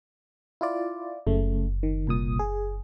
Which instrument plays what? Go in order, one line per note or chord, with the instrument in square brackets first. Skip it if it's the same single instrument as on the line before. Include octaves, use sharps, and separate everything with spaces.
[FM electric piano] E4 F4 D5
[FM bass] F#1 [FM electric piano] C#3 A3
[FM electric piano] D#3
C2 A#2 D#6
G#4